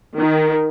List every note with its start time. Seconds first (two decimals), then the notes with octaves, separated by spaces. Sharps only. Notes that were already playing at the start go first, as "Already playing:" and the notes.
0.17 D#3